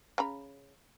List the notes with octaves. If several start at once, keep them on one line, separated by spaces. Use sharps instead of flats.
C#3 A#5 B5